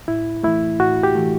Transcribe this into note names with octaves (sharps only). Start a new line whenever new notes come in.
A2 E4
E3 A3 E4
A2 F#4
G4
E3 A3